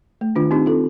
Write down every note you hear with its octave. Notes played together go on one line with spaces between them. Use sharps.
A3
D#3 D4 F4
C4 D#4 G4
C4 F4 A4